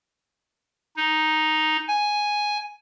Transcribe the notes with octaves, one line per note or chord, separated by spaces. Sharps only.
D#4
G#5